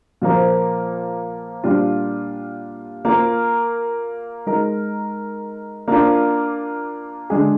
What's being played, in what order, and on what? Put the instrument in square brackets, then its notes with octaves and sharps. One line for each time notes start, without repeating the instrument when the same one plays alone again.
[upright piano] A#2 F3 A#3
A#2 G3 D4 F4
A#3 F4 A#4
G#3 D#4 A#4
A#3 D4 F4
D3 G#3 D4 G#4